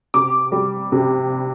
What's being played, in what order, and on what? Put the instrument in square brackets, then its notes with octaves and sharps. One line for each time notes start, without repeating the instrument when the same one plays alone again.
[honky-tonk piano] C3 D6
G3
C3